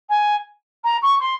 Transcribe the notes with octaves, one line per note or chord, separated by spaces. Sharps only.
G#5
A#5
C#6
C6